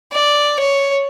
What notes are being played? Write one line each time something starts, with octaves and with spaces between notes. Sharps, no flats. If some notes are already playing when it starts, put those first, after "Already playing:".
D5
C#5